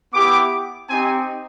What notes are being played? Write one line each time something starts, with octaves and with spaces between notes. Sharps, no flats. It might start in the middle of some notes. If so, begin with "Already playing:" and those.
B3 E4 G4 D6
C4 D#4 G4 G#5